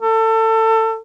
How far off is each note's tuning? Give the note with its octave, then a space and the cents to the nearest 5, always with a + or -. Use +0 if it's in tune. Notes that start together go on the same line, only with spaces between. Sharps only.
A4 +25